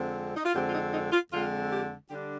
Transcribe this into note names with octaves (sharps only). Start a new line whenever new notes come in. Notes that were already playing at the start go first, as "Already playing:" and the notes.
Already playing: F2 D3 G#3 C4
D#4
F4
F2 D3 G#3 C4 G4
F4
D#4
D#4
F4
F2 D3 G#3 C4 F4
G4
D3 G3 D4 G4